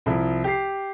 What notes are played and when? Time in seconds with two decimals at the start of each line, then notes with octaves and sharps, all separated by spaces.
0.06 C2 F3 E4
0.44 G4 C7